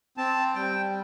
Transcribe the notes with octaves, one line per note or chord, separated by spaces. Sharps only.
C4 A5
G3 G5